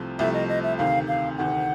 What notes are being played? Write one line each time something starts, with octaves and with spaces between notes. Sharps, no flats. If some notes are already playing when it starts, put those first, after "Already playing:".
Already playing: C2 C3 F3 A3
C2 C3 F3 A3 E5
D#5
D#5
E5
D2 C3 D#3 F5
F5
D2 C3 D#3 F#5